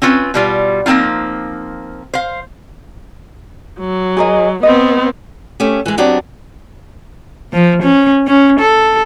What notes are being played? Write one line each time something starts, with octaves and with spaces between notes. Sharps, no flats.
C4 C#4 F4 B4
B2 G3 F4
F3 A#3 C4 D#4 F4
C5 F5
F#3
G#4 A#4 D#5
B3 C4 D#5
A3 C#4 G4
E3 G#3
F#3 B3 C4 D4 G4
F3
C#4
C#4
A4